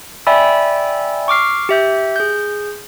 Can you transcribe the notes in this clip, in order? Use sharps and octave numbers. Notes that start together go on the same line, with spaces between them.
D5 E5 G5 G#5 B5 E6
C#6 D6 F6 C7
G4 E5 G6
G#4 G6